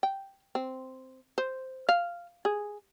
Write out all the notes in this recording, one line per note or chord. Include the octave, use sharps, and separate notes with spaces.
G5
C4
C5
F5
G#4